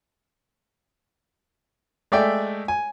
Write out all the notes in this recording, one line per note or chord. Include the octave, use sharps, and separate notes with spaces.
G#3 A3 D5 E5 G5
G#5